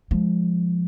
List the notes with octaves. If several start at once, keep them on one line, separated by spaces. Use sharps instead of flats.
F3 G#3